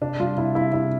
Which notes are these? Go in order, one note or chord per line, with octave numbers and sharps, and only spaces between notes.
C3 D4
G3 F4
C3 E4
C3 E4
C3 E4